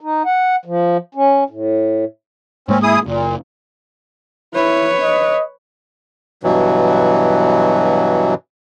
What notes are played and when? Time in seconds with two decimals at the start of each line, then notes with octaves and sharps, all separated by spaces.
0.01 D#4
0.25 F#5
0.65 F3
1.15 C#4
1.50 A2
2.68 G#2 G#3 A#3 C4 C#4
2.83 E4 G#4 D#6
3.06 F#1 A#2
4.54 E4 B4 C#5
5.01 D#5
6.43 G2 B2 E3 F#3